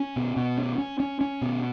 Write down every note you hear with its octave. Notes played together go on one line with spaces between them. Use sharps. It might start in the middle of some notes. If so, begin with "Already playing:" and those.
Already playing: C#4
B2
B2
C#4
C#4
C#4
C#4
B2